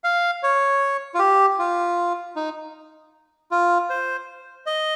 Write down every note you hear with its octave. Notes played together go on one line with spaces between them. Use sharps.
F5
C#5
F4
G4
F4
D#4
F4
C5
D#5